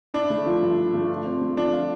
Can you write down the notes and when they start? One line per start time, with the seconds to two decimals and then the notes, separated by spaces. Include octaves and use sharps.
0.14 D4 E4
0.30 A3
0.46 F3
0.63 G2
0.78 E4
0.94 A3
1.10 F4
1.26 C4
1.42 A3
1.57 F3 D4
1.73 F4